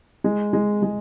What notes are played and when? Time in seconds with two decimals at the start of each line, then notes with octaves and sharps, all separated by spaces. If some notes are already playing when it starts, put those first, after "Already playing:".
0.24 G#3
0.53 G#3
0.83 G#3